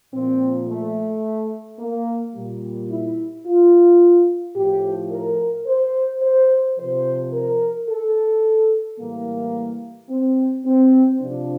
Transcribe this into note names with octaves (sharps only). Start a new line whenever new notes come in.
A#2 F3 C4
A3
A#3
A#2 G3
E4
F4
A2 F3 G4
A#4
C5
C5
C3 F3 C5
A#4
A4
A2 E3 G3 A#3
C4
C4
C3 F3 D4